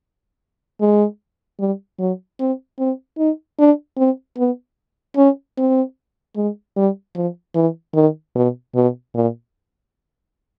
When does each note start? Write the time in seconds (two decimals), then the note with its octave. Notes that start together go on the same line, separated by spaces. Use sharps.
0.80 G#3
1.59 G3
1.99 F#3
2.40 C4
2.79 C4
3.18 D#4
3.59 D4
3.98 C4
4.38 B3
5.17 C#4
5.58 C4
6.37 G#3
6.76 G3
7.15 F3
7.55 E3
7.95 D#3
8.35 B2
8.75 B2
9.15 A#2